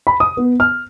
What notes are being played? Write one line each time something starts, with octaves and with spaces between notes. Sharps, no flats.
B5
D#6
B3
F6